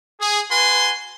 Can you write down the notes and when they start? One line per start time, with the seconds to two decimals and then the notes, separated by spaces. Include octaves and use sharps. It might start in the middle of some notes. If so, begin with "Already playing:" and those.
0.21 G#4
0.51 F#4 B4 G#5 C6